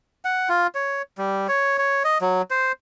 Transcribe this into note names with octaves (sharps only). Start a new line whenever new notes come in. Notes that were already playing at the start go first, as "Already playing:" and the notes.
F#5
F4
C#5
G3
C#5
C#5
D#5
F#3
C5